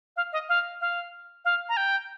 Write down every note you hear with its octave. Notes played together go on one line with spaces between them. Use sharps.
F5
D#5
F5
F5
F5
A#5
G5